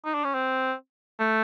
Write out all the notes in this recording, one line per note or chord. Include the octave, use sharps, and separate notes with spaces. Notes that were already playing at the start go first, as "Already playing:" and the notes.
D#4
D4
C#4
C4
A3